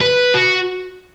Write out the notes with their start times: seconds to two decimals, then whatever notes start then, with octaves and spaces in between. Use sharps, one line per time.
0.01 B4
0.34 F#4